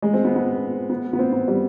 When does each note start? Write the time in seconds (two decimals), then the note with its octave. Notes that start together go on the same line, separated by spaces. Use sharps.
0.02 G#3
0.14 C4
0.24 B3
0.36 B3
0.90 B3
1.13 B3
1.19 C4
1.33 B3
1.48 G3